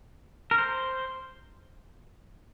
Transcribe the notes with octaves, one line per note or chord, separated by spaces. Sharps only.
A#4
C5